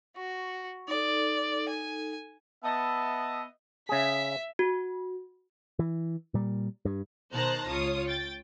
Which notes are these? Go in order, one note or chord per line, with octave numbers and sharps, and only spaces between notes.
F#4 C#6
D#4 A4 D5
G#5
B3 D#5 E5 A5
C#3 G#4 E5 B6
F#4
E3
A#2 G3
G2
B2 D#3 C5 A5 A#5 F#6
C#2 F4 C#5 D#6
G5 A6